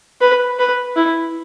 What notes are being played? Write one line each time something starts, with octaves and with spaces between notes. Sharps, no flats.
B4
B4
E4